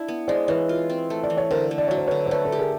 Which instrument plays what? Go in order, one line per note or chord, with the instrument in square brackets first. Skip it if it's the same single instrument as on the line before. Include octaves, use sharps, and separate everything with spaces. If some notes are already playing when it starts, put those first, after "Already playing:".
Already playing: [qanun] D4 E4
B3
[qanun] G#3 [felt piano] C5 D5
[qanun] E3 [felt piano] B4 C#5
[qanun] F4
C4
A3
[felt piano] D5
[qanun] E3
[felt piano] C#5
[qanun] D3 [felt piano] A#4 C5
[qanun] A3
[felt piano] D5
[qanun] F#3 [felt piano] C#5
[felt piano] C5
[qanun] D3 [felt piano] B4 C#5
[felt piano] C5
[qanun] A3 [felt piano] B4 C#5
[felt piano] A4 B4
[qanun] G4
[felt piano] G#4 A#4